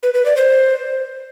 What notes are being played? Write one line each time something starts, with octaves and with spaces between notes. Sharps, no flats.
B4
B4
D5
C5